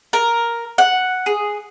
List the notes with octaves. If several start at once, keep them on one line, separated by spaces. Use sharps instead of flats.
A#4
F#5
G#4